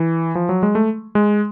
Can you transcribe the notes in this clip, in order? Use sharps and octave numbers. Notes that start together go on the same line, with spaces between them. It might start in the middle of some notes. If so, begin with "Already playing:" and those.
Already playing: E3
F3
F#3
G#3
A3
G#3